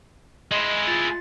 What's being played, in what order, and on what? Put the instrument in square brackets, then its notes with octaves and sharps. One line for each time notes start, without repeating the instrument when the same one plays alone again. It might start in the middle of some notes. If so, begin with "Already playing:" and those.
[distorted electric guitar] G#3 E4 [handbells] D#5 C6
[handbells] F4 A6 C#7